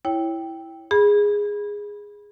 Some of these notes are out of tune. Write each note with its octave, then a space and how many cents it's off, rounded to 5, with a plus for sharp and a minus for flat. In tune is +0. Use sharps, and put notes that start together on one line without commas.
E4 +0 C#5 +0 G5 +0
G#4 -10 B5 -15